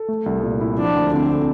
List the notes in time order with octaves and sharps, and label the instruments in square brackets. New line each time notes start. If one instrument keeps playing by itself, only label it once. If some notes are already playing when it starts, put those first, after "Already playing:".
Already playing: [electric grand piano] A4
A3
C2
A#2
E4
[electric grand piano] F3 [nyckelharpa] D4
[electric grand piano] D2
[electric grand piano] D3 [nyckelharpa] C4